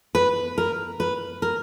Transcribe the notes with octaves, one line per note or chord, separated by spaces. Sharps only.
B4
A#4
B4
A#4